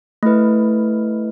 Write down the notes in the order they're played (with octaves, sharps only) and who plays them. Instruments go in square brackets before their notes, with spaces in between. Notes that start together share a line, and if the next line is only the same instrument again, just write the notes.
[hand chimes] A3 E4 B4